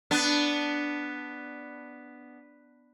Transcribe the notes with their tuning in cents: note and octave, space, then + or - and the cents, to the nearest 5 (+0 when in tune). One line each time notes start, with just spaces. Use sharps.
B3 +0 D4 +0